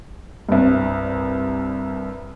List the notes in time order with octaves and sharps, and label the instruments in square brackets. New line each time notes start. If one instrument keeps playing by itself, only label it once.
[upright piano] C2 G2